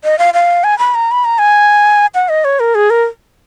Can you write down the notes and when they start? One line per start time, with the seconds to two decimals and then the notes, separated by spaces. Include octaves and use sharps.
0.04 D#5
0.19 F5
0.34 F5
0.64 G#5
0.79 B5
0.95 A#5
1.11 B5
1.25 A#5
1.39 G#5
2.15 F#5
2.29 D#5
2.45 C#5
2.60 A#4
2.75 G#4
2.90 A#4